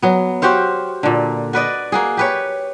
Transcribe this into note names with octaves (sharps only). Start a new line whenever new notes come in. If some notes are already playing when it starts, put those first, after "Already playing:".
F#3 B3
F#4 G4 C5 F5
A#2 D3
F#4 B4 D5 D#5
A#3 F#4 G#4
G4 B4 C#5